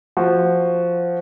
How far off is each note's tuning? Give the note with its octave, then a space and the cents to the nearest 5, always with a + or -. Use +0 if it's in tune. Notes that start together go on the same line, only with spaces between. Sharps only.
F3 -5 F#4 +0